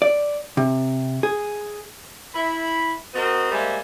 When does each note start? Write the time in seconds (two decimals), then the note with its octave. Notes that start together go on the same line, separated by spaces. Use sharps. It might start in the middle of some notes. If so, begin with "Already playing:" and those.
0.02 D5
0.57 C3
1.23 G#4
2.35 E4 B5
3.14 C4 F#4 A#4 C5 D#5
3.51 G3 G#3 A#3 C5 E5 G#5